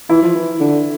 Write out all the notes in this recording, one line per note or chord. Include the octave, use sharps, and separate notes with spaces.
E3 E4
F3
E3
D3